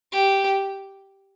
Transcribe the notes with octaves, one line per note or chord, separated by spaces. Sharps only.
G4